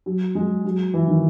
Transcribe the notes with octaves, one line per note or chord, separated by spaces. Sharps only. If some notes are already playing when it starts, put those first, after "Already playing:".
F#3
G#3
F#3
E3
D#3